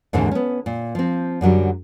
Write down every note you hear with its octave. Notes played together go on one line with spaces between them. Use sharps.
D#2 G#2 D3 E3 C4
B3 C#4
A#2
F3 C4
F#2 D3 F#3 G3